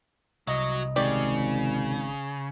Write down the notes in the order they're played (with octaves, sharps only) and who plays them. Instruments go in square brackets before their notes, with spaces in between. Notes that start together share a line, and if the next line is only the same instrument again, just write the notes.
[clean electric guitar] C2 D#5 [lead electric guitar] F#3
[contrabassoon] G#1 [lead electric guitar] C#3 [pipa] G4 D5